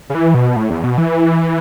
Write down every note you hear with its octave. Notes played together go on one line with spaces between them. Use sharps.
C#3
E3
B2
A2
E2
B2
E3